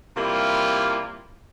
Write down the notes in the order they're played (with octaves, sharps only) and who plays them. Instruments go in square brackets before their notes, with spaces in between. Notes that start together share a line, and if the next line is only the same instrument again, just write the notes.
[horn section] C3 G3 A#3 E4 F4